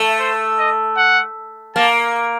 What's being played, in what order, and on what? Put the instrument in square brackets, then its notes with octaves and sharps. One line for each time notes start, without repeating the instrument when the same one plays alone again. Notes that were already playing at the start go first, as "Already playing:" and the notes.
Already playing: [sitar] A3
[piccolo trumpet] C5
D#5
F#5
[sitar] A#3 [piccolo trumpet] A5